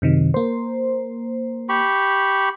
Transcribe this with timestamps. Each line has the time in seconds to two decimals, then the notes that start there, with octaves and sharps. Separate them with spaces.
0.02 F#2 C3 D#3
0.34 A#3 C5
1.69 G4 B5 C#6